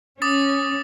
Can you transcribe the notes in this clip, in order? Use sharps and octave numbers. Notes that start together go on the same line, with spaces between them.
C#4 D6 D#6 A6